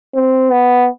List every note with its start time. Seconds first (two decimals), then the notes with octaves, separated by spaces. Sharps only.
0.15 C4
0.51 B3